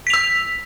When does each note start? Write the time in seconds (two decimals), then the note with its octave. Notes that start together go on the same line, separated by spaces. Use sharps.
0.07 B6
0.10 F7
0.13 E6